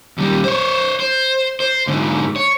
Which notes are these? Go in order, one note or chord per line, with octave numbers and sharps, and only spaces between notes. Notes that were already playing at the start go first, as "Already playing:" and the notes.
D#2 G3
C5 C#5
C5
C5
G#2 D3
C#5